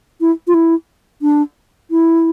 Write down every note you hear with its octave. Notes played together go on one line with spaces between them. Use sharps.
E4
F4
E4
D4
E4